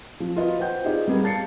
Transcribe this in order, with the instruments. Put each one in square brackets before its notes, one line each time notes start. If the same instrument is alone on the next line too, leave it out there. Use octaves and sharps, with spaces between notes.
[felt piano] F3
F4 F#4 A#4 B4 D#5
B4 C5 F#5 G5 G6
D#4 F4 G4 G#4 D5 D#5
G3 B3 G#4 A#4
F5 A5 A6 C7 C#7